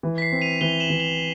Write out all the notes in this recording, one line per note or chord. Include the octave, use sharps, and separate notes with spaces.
E3
B6
C7
C4
D#7 F7
E3 F7 G7
E7 F#7
E3
F7 G7